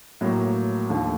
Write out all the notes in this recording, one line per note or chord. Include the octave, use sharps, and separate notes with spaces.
A2 F#3 A#3
D#2 D3 F3 A3